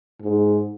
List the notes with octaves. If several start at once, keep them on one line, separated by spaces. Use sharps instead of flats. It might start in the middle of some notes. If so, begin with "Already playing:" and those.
G#2